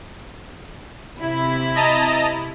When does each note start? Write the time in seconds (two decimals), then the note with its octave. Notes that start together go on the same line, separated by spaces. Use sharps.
1.19 C3 E4
1.76 D#5 A5 A#5